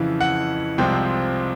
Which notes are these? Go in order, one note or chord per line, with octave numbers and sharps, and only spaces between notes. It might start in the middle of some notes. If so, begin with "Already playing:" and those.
Already playing: F2 C#3 E3
F#5
C2 C3 F3 G#3 C4 G5